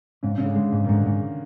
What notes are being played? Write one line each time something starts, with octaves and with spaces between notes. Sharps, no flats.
G#2 C#3
G#2 C#3
D3
G#3
G#2
D#3
G#2 D3
G#2